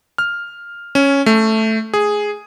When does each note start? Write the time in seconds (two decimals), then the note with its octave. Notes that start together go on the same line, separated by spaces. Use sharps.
0.18 F6
0.95 C#4
1.26 A3
1.94 G#4